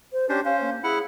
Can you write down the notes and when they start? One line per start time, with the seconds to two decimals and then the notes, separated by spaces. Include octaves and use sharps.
0.13 C5
0.29 C#4 D4 G4 C5
0.45 C#4 C5 F5
0.61 A#3
0.83 E4 G#4 F#5